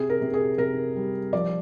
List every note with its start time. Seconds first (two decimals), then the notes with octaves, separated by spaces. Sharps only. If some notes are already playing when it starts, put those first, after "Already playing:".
Already playing: C3 G#4
0.10 A#4
0.21 C3
0.34 G#4
0.58 C3 A#4
0.96 G3
1.33 F3 D5